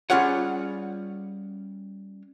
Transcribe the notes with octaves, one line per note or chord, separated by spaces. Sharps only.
G3 C#4 F4 G#4 C#5 F#5